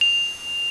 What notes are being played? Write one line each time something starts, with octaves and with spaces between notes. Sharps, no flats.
F7